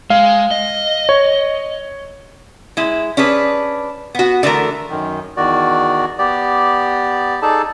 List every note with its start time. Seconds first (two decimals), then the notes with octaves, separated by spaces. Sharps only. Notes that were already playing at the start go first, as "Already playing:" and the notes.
0.10 G#3 F5
0.51 D#5
1.09 C#5
2.77 G#3 E4
3.17 C#4 D4 G#4 B4
4.15 B3 F#4
4.43 D3 E3 A3 A#4
4.90 F#2 D#3
5.37 E2 D#3 F#4 D5
6.19 B3 G4 D5
7.42 D#4 G#4 A4 D5 A5